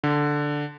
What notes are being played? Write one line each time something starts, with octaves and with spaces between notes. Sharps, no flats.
D3